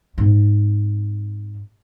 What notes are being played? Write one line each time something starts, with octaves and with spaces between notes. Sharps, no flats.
G#2 C4